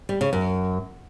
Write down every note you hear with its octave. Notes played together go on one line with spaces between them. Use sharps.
G3
C#3
F#2